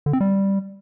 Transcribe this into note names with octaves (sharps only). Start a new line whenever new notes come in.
D3
C4
G3